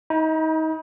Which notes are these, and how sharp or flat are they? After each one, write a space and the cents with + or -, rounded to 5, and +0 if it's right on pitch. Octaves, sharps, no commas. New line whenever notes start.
D#4 +30 B5 -45